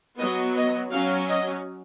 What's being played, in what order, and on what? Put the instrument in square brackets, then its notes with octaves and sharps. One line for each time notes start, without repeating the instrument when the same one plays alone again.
[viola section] F#3 B3 D#5
D#5
F#3 C#4 F5
D#5